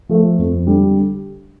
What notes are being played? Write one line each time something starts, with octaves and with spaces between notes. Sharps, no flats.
F3 A3
F2
D3 G3